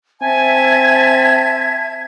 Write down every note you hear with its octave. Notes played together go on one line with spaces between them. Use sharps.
C4 E5 G#5 A5 G#6